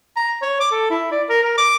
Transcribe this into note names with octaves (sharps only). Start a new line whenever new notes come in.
A#5
C#5
D6
A4
E4
D5
A#4
A#4
D6